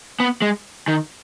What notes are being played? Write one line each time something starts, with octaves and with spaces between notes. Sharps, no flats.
B3
G#3
D#3